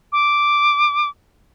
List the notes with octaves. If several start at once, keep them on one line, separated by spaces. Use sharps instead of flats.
D6